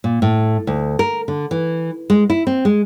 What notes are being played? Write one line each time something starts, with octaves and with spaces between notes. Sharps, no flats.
A#2
A2
D2
A#4
D3
E3
G#3
E4
C4
G#3